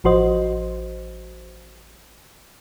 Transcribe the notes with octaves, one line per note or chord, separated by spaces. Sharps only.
A1 F3 F#4 C5 D#5